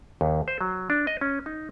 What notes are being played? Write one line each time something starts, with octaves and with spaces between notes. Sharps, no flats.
D#2
C5
F#3
D4
D#5
C#4
D#4